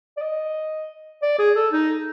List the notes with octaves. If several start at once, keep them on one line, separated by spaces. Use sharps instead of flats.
D5
D#5
D5
G#4
A4
D#4